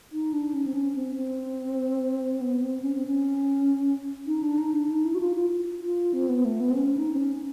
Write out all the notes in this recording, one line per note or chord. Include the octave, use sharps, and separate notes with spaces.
D#4
D4
C#4
C4
C#4
C4
C4
B3
C4
C#4
C4
C#4
D#4
D4
D#4
D4
D#4
E4
F#4
F4
F4
F4
C4
B3
A3
B3
C4
C#4
D#4
C4
C#4